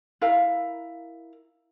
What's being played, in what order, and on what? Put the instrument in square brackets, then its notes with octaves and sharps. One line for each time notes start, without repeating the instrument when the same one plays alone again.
[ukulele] E4 A#4 F5